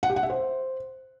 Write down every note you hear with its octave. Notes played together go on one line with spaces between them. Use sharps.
F#5
G4
F#5
E5
C5